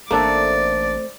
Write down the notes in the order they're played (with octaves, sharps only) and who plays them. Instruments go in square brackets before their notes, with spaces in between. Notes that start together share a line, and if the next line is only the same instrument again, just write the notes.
[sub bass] A1 [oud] A3 C4 [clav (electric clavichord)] A#3 D4 A4 [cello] D5